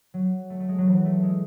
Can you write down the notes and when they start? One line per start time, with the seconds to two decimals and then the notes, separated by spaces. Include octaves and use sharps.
0.14 F#3
0.50 A3
0.60 A3
0.69 G#3
0.78 F#3
0.87 E3
1.05 A3
1.23 G#3